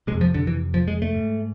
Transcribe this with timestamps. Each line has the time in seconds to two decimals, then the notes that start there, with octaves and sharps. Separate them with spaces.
0.07 C3 G#3
0.11 F2
0.21 F3
0.34 D3
0.47 E3
0.74 F3
0.88 G#3
1.02 A3
1.14 G#2